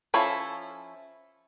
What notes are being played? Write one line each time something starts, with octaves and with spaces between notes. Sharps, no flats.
F3 C#4 E4 A4 B5